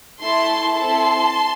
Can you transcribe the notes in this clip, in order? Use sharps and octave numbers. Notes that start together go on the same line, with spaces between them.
A3 E4 A4 A5 C6
C4 E4 A4 A5 C6